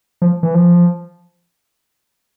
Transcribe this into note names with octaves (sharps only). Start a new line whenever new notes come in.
F3
E3
F3